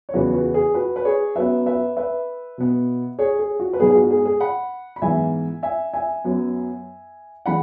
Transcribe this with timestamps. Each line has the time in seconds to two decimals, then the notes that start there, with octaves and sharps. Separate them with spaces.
0.09 C#5
0.13 E2 C#3 E3 B3 F#4 B4
0.34 F#4 B4
0.54 G#4
0.74 F#4 B4
0.96 B4
1.05 G#4 C#5
1.36 F#2 F#3 B3 B4 E5
1.66 B4 E5
1.97 B4 E5
2.58 B2 B3
3.19 G#4 C#5
3.39 G#4
3.60 F#4
3.73 B4
3.80 G#2 G#3 B3 G#4
3.90 G#4
3.95 F#4
4.11 G#4
4.26 G#4
4.40 F#5 B5
4.96 B5
5.02 G#2 E3 B3 E5 G#5
5.63 E5 G#5
5.94 E5 G#5
6.24 F#2 F#3 B3
7.46 E3 G#3 F#5 B5